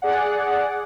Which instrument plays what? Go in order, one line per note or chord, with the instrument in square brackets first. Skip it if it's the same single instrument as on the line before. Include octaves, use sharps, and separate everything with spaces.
[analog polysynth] G#4 D5 F#5